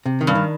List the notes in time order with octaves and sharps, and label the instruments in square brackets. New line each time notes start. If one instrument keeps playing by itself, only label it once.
[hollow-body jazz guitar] C3
D#3
[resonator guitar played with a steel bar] G2
[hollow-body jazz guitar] D#3